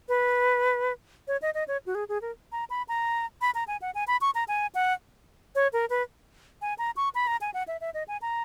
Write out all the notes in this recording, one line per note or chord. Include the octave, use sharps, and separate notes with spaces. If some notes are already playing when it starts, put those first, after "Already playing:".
B4
C#5
D#5
D#5
C#5
F#4
G#4
G#4
A#4
A#5
B5
A#5
B5
A#5
G#5
F#5
G#5
B5
C#6
A#5
G#5
F#5
C#5
A#4
B4
G#5
A#5
C#6
B5
A#5
G#5
F#5
E5
E5
D#5
G#5
A#5